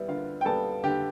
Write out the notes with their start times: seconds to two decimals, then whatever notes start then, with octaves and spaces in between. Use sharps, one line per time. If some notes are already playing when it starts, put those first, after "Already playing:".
Already playing: G3 B3 E4 E5
0.08 D3 F4 F5
0.41 G5
0.45 G3 B3 A4 A5
0.84 D3 G4 G5